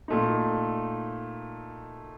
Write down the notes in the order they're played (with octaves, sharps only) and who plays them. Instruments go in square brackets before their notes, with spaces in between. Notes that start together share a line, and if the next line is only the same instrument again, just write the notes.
[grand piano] A#2 A3 D#4